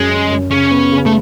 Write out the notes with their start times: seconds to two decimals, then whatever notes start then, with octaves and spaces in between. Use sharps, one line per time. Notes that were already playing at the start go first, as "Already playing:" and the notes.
Already playing: F#2 G#3
0.09 C#4
0.30 F#2
0.51 C#3 C#4
0.71 B3
0.92 C#3
1.06 A3